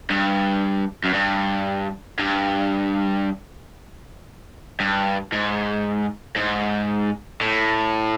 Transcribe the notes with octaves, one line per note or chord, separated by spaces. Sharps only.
G2
F#2
G2
G2
G2
G#2
G#2
A2